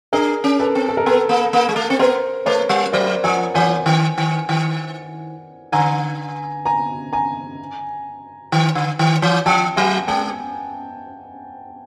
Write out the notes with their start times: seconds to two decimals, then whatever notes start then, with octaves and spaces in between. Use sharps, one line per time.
0.13 D4 G#4 A#4
0.44 C#4
0.60 A4 B4
0.75 C4
0.89 A4
0.97 A#4
1.06 B3 A4 B4
1.29 A#3
1.53 A#3
1.69 G#3
1.76 A3
1.90 C4
1.99 B3 A#4 C5
2.46 A3 B4 C#5
2.69 G3
2.92 F#3 C5 D5
3.24 F3 F#5 G#5
3.55 E3 F#5 G#5
3.86 D#3
4.18 D#3
4.49 D#3
5.72 D3 G#5 A#5
6.66 G#5 A#5
7.13 G#5 A#5
8.52 D#3
8.75 D3
8.99 D#3
9.22 E3
9.46 F3 G5 A5
9.76 F#3 F#5 G#5
10.08 G#3 G5 A5